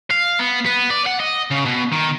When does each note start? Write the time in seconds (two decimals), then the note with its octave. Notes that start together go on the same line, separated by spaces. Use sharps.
0.11 F5
0.39 B3
0.66 B3
0.90 D5
1.06 F#5
1.20 D#5
1.51 C#3
1.65 B2
1.92 D#3